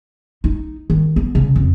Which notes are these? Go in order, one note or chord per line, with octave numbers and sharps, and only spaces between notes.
D#4
D#3
B3
C#3
F2